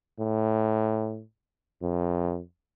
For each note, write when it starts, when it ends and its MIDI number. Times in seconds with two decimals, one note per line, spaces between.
0.19 1.22 45
1.82 2.41 41